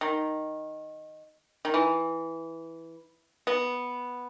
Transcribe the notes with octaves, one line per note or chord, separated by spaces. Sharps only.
D#3
D#3
E3
B3